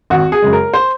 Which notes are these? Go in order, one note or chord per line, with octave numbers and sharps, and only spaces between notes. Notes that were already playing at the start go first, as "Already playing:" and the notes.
G#1 F#4
G#4
F#2 C#3 G#3
A#4
C5